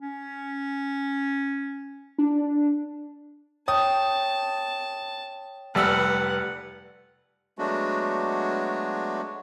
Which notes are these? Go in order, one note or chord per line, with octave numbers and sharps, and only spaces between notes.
C#4
D4
C#5 G5 A5 D#6
F1 G3 B4 F#5 E6
F#3 G#3 A3 B3 D4 F#4